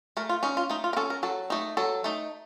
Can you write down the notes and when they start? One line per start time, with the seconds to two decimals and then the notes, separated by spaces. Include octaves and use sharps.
0.17 A3 A#4
0.29 F4
0.43 C#4 D#4
0.57 F4
0.70 A3 D#4
0.84 F4
0.93 A#4
0.96 C#4 A4
1.10 A#4
1.23 F#3 A4
1.50 A3 D#4
1.77 F#3 A4
2.04 A3 D#4